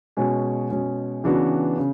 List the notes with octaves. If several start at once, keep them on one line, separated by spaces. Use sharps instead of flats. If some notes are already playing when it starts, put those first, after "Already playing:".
B2 G#3 C#4 G#4
B2 G#3 C#4 G#4
C#3 E3 B3 D4 F#4
C#3